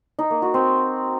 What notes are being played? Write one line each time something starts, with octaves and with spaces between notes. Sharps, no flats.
D#4
A#3
F#4
C4